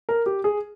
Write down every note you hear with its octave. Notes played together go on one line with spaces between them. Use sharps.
A#4
G4
G#4